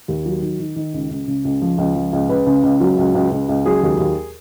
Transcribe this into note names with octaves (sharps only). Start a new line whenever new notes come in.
D#2
F#3
D#3
D#3
D#3
C#2
C#2
C#3
C#2
F3
C#2
F3
C#2
C#2 B4
C#3
C#2
F#3
C#2
C#2
C#2
C#2
F#3 G#4
D#2
D#2